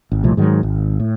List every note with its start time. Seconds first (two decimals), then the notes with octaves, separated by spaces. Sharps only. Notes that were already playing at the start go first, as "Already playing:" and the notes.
0.12 G#1
0.23 C2 A#2 F3 A3
0.37 G#2 D#3 F#3
0.63 G#1
1.00 A2